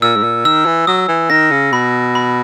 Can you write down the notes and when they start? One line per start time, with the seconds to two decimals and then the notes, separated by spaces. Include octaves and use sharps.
0.02 A#2 E6
0.17 G#2
0.23 A#2
0.45 D#3 E6
0.66 E3
0.87 F#3 D#6
1.08 E3
1.30 D#3 A#6
1.51 C#3
1.72 B2 B5
2.15 B5